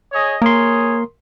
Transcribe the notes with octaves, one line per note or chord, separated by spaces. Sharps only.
G#4 C#5 D#5
A#3 G#4 A#4 C#5 C6 D#6